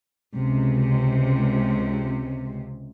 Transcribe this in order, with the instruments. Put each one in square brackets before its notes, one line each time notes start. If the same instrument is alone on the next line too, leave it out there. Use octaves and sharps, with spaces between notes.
[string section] C#2 C3